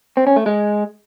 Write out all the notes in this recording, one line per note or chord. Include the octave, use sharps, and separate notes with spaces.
C4
C#4
A3
G#3